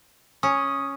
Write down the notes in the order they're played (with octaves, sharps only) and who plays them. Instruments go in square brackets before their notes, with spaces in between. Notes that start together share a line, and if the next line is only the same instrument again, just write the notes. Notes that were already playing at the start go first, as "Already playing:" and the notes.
[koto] C#4 [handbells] D#6